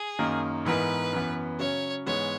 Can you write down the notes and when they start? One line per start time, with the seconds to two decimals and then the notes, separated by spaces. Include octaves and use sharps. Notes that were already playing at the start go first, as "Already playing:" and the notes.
Already playing: G#4
0.19 F#2 D#3 A#3 D#4
0.65 G#2 E3 B3 D#4 A#4 B4
1.13 F#2 E3 B3
1.59 C#3 F#3 C#4 C#5
2.06 G#2 E3 G#3 B3 C#5